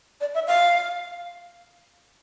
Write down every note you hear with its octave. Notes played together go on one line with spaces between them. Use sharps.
D5
E5
F5